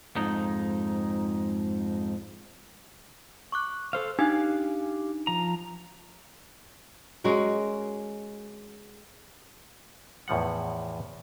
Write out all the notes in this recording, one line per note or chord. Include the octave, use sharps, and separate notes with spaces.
F2 G#2 D#4
C#6 D6 F#6
A4 C5 F5
D4 D#4 G4 F5 G#5 F#6
F3 A#5
G#3 C#4 F#4 A#4
E2 A2 F3 F#5